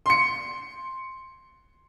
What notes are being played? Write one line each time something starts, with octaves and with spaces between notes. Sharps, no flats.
C6 C#7